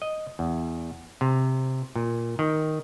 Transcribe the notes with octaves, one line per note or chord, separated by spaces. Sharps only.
D#5
E2
C3
A#2
D#3